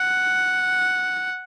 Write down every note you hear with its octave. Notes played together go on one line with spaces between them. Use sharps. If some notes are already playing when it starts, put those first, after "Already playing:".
Already playing: F#5